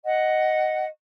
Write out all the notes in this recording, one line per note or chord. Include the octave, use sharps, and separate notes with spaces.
D#5 F#5